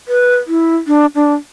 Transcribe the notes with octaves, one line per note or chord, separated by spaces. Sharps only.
B4
E4
D4
D4